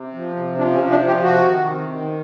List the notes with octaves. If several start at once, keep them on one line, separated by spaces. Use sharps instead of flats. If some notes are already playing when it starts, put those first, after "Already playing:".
Already playing: C3
F3
C3
F3 D4
C#4
C3
D4
F3
G4
C3 F#4
D#3
C3
D#3